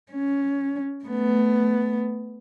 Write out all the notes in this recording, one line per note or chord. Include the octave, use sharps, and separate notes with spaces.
C#4
A3 B3